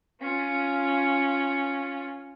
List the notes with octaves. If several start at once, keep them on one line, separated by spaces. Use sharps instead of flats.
C#4 F4